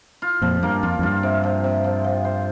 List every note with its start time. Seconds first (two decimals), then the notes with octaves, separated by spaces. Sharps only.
0.22 F4
0.42 F2 A#2 F3
0.62 G2 A#3
0.83 F2 F4
0.99 F2
1.03 G2 F4
1.23 C3
1.44 F3
1.64 C3
1.84 F3
2.04 F3
2.25 C5